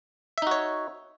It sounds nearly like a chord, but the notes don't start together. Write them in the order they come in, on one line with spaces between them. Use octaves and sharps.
E5 D#4 F#4 C#5